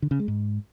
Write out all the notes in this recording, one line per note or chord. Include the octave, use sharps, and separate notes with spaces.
D3
C#3
G#3
G#2